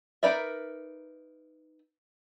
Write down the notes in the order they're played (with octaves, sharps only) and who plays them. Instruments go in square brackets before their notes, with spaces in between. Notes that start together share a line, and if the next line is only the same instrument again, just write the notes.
[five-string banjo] D#4 A#4 B4 D5 E5